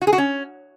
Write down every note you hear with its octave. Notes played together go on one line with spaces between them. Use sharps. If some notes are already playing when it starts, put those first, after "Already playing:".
F#4
G#4
F#4
C#4